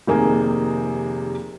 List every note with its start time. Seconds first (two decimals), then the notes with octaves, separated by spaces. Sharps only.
0.07 F1 C3 D#3 A#3 G#4 G#5